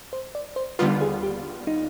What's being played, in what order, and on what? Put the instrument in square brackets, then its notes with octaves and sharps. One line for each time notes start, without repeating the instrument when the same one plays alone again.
[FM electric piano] C5
D5
C5
[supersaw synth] D#2 D3 G3 B3 F4 [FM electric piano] B4
[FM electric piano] G#4
G4
D#4